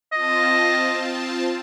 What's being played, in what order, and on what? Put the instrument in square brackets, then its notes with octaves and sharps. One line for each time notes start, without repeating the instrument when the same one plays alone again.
[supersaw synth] C4 F4 A5 [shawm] D#5